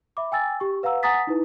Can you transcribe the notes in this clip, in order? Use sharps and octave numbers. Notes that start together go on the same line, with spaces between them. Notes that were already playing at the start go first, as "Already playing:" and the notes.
E5 B5 D6
G5 G#5 E6 A6
G4 C#6
B4 F5 F#5 A#5 E6
F#5 G#5 A#5 D#6 A6 B6
D#4 E4 B4